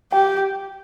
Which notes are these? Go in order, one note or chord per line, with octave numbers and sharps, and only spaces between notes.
G4 G5